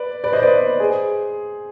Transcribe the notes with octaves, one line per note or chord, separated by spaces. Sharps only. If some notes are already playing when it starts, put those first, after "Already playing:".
Already playing: B4 D5
B4 D5
C5 D#5
B4 D5
G#4 C5